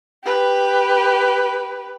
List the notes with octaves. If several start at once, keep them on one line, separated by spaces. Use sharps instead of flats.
G4 B4